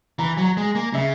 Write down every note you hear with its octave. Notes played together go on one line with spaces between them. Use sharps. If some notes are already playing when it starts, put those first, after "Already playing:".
E3 A#5
F#3
A#5
G#3 G#5
A#3
C#3 E5